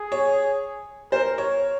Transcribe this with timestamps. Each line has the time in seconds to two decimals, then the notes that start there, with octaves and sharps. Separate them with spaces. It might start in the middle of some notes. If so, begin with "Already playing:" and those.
Already playing: G#4
0.12 C#5
1.12 A#4 C5
1.38 C#5